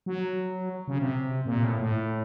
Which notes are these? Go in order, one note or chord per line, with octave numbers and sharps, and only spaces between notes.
F#3
C#3
C3
A#2
A2
A2